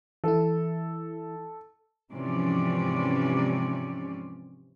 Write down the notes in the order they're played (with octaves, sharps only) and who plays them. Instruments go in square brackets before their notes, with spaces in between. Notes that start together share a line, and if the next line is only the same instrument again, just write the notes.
[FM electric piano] E3 E4 [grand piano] A4
[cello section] G#2 C3 E3 F3 C#4 D5